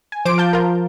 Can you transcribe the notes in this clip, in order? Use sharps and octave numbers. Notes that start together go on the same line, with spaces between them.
G#5
F3 C5 D6 D7
F5 A5 G6
F4 A#4